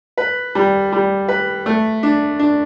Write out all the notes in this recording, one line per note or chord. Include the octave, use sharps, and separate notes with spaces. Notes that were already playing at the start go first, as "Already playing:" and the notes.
B4
G3
G3
B4
A3
D4
D4